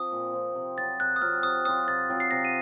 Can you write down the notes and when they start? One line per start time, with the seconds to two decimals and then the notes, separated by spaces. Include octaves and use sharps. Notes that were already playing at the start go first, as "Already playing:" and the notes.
Already playing: F3 C4 D#6
0.12 A#2
0.34 F3 C4
0.55 C3
0.78 F#3 C4 F4 A6
0.99 C3 F#6
1.16 D#6
1.21 F#3 C4 F4 F6
1.43 C3 D#6
1.65 F#3 C4 F4 D#6
1.87 C3 A6
2.10 F#3 C4 F4
2.20 C7
2.31 C3 A#6
2.45 D#7